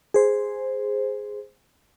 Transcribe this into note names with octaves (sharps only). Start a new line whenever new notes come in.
G#4 C5